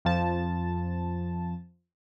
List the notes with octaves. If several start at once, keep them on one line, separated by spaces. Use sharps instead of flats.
F2 F3 A5